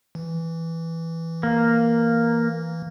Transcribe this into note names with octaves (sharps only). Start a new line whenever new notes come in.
E3
A#3